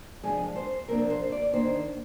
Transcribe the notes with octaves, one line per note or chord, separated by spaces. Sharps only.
C3 F3 G#3 D4 G#4
C5
C3 F3 A#3 D4 A#4
C5
D5
D#3 A#3 D4 C5